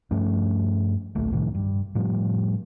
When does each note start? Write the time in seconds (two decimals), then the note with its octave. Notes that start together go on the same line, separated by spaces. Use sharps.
0.11 G2 F3 A3 C#4
1.15 D1 A#1 A3
1.31 C2 A2 D#3 F3
1.55 G2
1.95 A2 F3 G3